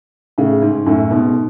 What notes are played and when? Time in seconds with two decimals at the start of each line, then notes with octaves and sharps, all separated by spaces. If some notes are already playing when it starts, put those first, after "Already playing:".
0.38 A2 C#3
0.62 G#2
0.86 F#2 A2
1.11 G#2 B2